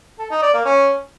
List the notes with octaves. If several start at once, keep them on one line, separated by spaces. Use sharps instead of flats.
A4
D#4
D5
A#3
C#4